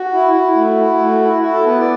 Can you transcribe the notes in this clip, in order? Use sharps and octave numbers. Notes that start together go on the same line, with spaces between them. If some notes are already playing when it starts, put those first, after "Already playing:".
Already playing: F#4
E4
E4
A3
E4
A3
E4
E4 F#4
A4
B3 B4
D5